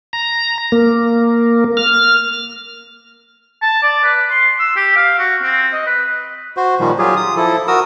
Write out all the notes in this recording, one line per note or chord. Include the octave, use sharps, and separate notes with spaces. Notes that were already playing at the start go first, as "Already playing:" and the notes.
A#5
A#3
F6
A5
D5
B4
C6
E6
G4
F5
F#4
C4
D#5
B4
F#4 C5
A#2 D#3 F3 G3
F#3 F4 G4 G#4
D#6
F3 E4 A4
F#4 A#4 D#6 E6